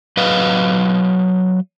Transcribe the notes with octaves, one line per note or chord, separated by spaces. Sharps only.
F#3 B4 D#5 F5